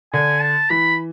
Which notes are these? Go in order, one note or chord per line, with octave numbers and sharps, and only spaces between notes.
D3 G#5
A5
E3 B5